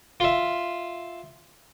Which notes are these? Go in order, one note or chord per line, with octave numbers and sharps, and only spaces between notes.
F4 E5